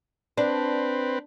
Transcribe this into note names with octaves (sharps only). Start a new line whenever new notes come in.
C4 D4 B4